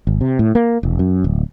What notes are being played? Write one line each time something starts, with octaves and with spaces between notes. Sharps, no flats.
G#1
C3
A2
A#3
E1
F#2
D1